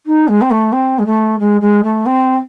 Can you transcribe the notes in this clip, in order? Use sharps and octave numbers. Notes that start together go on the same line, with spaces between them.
D#4
G#3
C4
A3
C4
G#3
A3
G#3
G#3
A3
C4